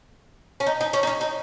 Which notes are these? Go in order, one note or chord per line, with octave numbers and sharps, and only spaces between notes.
C#4
D#4
D#4
C#4
D#4
C#4
D#4